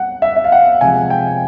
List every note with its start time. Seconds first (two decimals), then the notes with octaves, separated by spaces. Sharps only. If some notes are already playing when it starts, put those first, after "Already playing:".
Already playing: G3 F#5
0.22 E5
0.36 E5
0.44 F5
0.52 F#5
0.81 C3 F3 G#3 G#5
1.10 G5